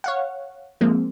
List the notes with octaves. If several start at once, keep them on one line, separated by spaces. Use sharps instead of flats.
C#5 F5 F#5
F3 G#3 A#3 C4